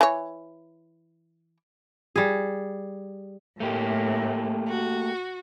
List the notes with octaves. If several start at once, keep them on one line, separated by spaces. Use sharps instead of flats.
E3 C#5
G3 G#4
A2 A3 A#3 G4
F#4